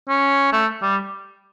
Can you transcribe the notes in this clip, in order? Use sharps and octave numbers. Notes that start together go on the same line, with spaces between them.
C#4
A3
G3